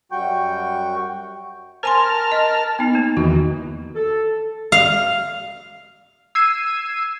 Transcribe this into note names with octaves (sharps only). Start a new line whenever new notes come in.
F#2 G3 F#4 G5 C#6 G6
A#4 C5 G#5 A5 C6 F6
D#5
B3 D#4
A#3
E2 D#3 F#4
A4
F5
E6 G#6 C7 D#7